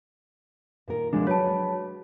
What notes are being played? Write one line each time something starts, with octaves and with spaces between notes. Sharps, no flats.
A#2 D#3 A#4
D2 C3 F3 G#3 D4
F#3 G#3 B4 C#5 A5